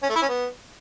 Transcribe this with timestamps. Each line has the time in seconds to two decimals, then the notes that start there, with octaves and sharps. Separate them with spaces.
0.03 C#4
0.09 A3
0.16 E4
0.22 C#4
0.29 B3